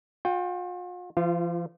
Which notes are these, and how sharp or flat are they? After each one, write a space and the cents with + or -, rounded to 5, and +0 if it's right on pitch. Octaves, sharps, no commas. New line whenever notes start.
F4 +45 G5 +0
F3 -40 F4 +0 F5 -40